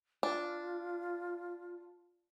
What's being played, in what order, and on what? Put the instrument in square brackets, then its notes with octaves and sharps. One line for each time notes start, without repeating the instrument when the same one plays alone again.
[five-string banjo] D4 [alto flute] F4